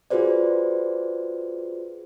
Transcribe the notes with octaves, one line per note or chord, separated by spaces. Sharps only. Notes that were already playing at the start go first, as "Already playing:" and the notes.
F4 F#4 G#4 B4 C5 D5